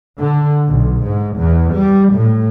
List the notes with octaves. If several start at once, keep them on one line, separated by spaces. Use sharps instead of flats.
D3
B1
G#2
E2
G3
A2